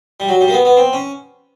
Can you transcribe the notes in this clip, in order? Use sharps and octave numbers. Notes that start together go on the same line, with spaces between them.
G3
F#3
G3
A#3
B3
B3
C4
C#4